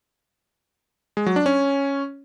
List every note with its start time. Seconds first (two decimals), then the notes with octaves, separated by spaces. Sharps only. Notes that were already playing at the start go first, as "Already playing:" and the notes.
1.17 G#3
1.26 F#3
1.36 D4
1.46 C#4